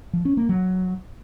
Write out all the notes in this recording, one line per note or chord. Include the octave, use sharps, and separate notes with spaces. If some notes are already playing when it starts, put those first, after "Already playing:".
F3
C#4
A#3
F#3